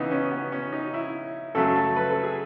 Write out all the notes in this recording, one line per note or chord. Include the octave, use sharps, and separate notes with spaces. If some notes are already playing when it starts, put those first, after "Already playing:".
Already playing: C#3 E3 B3 D#4
C#4
B3
C#4
D#4
E4
F#2 C#3 F#3 A3 A4
A4
B4
A4
G#4